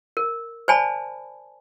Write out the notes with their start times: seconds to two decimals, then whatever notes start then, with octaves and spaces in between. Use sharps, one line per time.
0.17 A#4
0.68 C5 D5 G#5 A5 B5